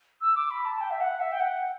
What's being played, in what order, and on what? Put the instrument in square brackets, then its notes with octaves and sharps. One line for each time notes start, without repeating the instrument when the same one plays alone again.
[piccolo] E6
D6
B5
A5
G5
E5
F#5
E5
G5
F#5